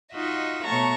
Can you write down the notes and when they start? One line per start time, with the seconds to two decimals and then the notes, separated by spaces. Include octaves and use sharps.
0.12 D#4 F4 F#4 D#5 E5
0.64 B2 A3 C#5 A5 A#5 C#6